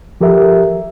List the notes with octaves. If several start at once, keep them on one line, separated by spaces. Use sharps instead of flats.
F3 G4 A4 A#4 E5